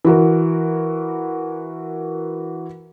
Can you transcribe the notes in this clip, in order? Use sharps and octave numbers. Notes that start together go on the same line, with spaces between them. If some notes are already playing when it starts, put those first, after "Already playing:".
E3 F#4 A#4